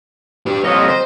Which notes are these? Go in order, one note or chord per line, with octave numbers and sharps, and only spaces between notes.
G4 B4
F2 G3 C#5 D#5
C5